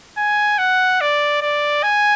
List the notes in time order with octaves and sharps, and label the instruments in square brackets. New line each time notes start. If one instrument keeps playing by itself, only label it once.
[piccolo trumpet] G#5
F#5
D5
D5
G#5